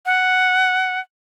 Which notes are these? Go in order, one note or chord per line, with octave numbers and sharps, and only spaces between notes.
F#5